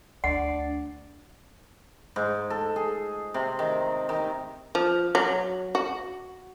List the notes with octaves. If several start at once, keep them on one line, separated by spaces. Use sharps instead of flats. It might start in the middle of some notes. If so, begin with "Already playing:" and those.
D2 D4 D5 F#5
G#2
A4
G#4
C3
D#3
D#3
F3
F#3
F#4